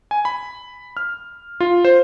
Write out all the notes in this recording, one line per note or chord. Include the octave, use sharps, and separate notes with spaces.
G#5
B5
F6
F4
C5